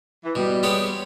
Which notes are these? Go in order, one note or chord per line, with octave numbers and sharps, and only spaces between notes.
E3
B2 G3
G#3 B3 G4 C#5